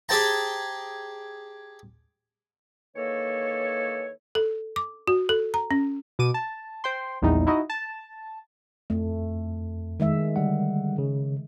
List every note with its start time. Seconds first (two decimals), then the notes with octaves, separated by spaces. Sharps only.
0.09 G4 G#4 C5 G5 A5 A#5
2.96 D#3 E3 A#3 A4 C#5
4.35 A4
4.76 D6
5.07 F#4
5.29 A4
5.54 A#5
5.71 C#4
6.19 B2 D6 D#7
6.34 A5
6.84 C5 G5 C6
7.22 A#1 E2 G3 D#4
7.47 D#4 E4 F#4 D#5
7.70 A5
8.90 F2 A3
10.00 D#3 G#3 E5
10.36 D3 G3 F#5
10.98 C#3